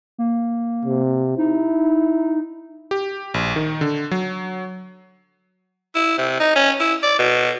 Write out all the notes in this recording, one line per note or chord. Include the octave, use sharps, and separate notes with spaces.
A#3
C3
D#4 E4
G4
A#1
D#3
D3
F#3
E4
C3
D#4
C#4
E4
D5
B2